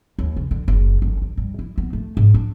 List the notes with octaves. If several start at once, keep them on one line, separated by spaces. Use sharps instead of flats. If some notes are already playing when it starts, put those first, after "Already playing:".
D#2
C#3
D3
F#1
G1
D3
G2
E4
B3
A3
G#2
D4